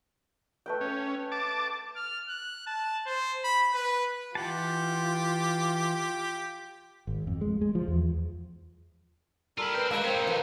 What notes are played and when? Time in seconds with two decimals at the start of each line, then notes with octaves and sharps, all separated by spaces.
0.66 A3 B4 G5
0.81 C#4
1.32 A5 D6
1.96 F6
2.29 F#6
2.67 A5
3.06 C5
3.44 B5
3.73 B4
4.35 E3 F4 G4 F#5 A5
7.07 G#1
7.27 F2
7.41 G#3
7.61 G#3
7.75 F3
7.88 E2
9.58 G3 F4 A4 A#4 B5
9.74 B4 C5 G5
9.91 F#3 G#3 A#3 D4 B4
10.04 C4 C5 C#5 E5
10.15 C2 D#4
10.27 F2 B4